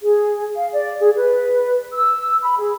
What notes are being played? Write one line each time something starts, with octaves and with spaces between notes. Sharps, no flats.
G#4
F5
D5
G#4
B4
E6
B5
G#4